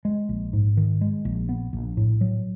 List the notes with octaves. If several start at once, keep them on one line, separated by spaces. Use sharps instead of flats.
G#3
A#1
G#2
D#3
G#3
A#1
B3
A#1
A2
F#3